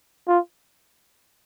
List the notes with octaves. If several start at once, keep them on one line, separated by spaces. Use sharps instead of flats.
F4